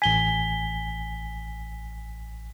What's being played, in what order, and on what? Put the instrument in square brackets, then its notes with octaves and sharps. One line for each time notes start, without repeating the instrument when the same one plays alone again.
[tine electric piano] A1 G#5 [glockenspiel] B6 G7